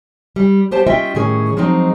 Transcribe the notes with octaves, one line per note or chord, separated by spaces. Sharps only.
G3
B3 G4 C5 A5
C#4 F4 D#5 E5 G5
A2 D#3 C#4 G#4
F3 F#3 G#3 C4 D#4